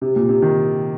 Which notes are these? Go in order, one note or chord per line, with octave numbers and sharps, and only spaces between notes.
C3
A#2
C3
D#3